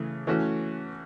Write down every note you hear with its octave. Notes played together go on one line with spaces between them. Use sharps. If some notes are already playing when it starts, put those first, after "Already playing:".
Already playing: C#3 E3 A3
E3 A3 C#4 F#4